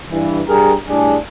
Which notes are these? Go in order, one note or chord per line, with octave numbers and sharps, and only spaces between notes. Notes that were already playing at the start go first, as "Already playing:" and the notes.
G2 E3
G2 G4 G#4 A#4
A2 G3 D4 G#4